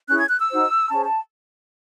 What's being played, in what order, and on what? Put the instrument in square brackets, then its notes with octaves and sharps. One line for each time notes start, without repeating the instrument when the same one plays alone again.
[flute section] C#4 E4 G#4 F#6
G#6
F#6
E6
D#4 F#4 C5
C#4 G#4 C5 A5
A5